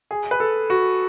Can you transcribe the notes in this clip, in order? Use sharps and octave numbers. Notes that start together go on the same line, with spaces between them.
G#4
B4
A4
F#4